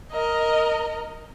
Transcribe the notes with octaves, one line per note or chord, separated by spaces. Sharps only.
A#4 D#5